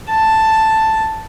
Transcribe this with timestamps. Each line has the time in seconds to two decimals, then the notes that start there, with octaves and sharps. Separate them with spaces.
0.10 A5